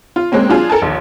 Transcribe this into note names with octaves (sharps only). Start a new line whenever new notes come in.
F4
G#3 A#3 C4 C#4
F#3 D4 F4 G#4
A4 A#4 G#5 A5
A#1 D#2